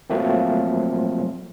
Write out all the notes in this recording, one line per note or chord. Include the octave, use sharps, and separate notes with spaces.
F3 F#3 A3 A#3 C4